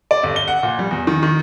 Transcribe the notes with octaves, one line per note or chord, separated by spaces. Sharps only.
D5
G1
G7
F#5
A#2
G3
E2
D#3
D#3